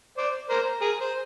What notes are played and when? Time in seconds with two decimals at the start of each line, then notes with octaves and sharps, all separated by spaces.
0.17 C5 D5
0.49 A#4 C5
0.80 G#4 A#4
1.01 C5